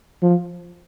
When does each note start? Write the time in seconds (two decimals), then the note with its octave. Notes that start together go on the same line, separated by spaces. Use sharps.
0.22 F3